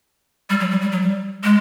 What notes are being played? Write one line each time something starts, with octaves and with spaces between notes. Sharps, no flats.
G3
F#3
G3
G3
F#3
G3
G#3